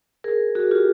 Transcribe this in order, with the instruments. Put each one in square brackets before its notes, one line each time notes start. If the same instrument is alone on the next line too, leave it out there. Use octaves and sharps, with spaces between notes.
[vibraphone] G#4 A#4
F#4 G#4
F4 G4